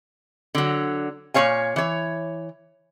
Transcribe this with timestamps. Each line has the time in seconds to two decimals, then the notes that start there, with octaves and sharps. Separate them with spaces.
0.55 D3 F#3
1.34 A#2 E3 C#5 F5 G#5
1.76 E3 C#5